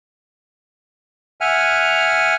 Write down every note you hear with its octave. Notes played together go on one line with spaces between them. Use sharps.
E5 F#5 G#5 F6